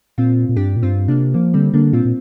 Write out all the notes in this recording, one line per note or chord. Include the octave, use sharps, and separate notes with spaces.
A#2 C4 F4
A#2
G2 D4 G4
A#2
G2 C4 F4
C3 A#3 D4
F3 A#3
D3 G3 C4
D3 A#3 D4
A#2 C4 F4
A#2